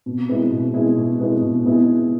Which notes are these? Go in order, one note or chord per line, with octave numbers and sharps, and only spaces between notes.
B2
G#3 B3 E4 G#4
B2
G#3 B3 E4 G#4
B2
G#3 B3 E4 G#4
B2
G#3 B3 E4 G#4